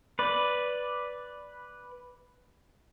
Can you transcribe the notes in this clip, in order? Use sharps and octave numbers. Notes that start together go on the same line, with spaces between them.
B4 D5